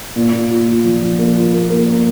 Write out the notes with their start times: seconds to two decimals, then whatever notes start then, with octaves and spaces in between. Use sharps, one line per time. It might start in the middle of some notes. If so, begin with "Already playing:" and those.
0.16 A#2
0.33 A#2
0.50 F4
0.68 F4
0.84 F3
1.02 F3
1.19 A#3
1.36 F4
1.53 A#3
1.70 A#3
1.88 A#3